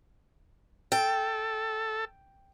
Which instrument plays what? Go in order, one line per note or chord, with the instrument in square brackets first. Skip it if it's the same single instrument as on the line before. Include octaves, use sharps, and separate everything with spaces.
[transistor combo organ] A4 [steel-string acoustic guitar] G5